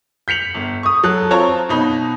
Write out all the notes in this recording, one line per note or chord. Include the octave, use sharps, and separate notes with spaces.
G6 B6 C#7 F7 F#7
G1
C#6 D#6
F#3 A4 F#6
C4 F4 C#5 A5 A#5
B2 D#4 B5